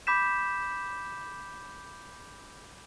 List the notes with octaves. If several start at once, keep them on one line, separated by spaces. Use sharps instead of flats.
B5 D6 G6 B6 E7